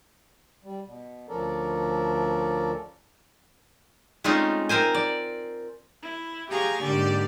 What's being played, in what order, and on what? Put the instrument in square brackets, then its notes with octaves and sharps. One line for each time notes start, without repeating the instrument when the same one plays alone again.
[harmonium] G3
B2
D2 F3 C#4 A4 A#4 D5
[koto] G#3 A3 C4 C#4 D#4 F4
C4 A#4 C5 G#5
D5
[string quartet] E4
G4 G#4 F5 G#5 A#5 C#6
G#2 D3 A#3 G4 D5